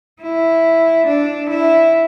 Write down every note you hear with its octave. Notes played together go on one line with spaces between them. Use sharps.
E4
D4
E4